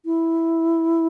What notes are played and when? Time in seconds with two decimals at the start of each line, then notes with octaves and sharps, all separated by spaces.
0.06 E4